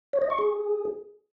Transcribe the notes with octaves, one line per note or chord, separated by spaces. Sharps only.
C#5
D#5
C#6
G#4